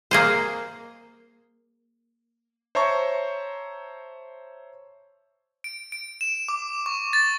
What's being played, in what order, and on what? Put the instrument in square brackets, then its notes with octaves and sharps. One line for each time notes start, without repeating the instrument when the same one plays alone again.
[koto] A#3 G#4 C5
[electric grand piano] C5 C#5 E5 A5 A#5 C#6
[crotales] D7
D7
E7
D6
C#6
A6